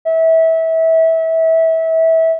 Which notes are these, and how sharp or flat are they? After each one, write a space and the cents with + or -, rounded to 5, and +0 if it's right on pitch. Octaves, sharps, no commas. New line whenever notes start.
E5 -25